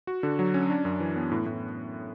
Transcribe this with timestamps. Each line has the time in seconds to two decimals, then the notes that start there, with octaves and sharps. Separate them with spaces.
0.07 F#4
0.23 D3
0.39 F#3
0.54 C#4
0.70 D4
0.85 F#2
1.00 E3
1.16 B3
1.32 A2
1.46 A2